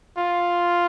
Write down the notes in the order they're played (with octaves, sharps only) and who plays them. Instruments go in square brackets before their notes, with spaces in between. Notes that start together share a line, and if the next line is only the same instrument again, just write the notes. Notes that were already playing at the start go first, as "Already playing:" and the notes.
[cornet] F4